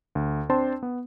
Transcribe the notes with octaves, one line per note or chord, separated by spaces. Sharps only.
D2
C4 D4 C5 G5 A5 C6
B3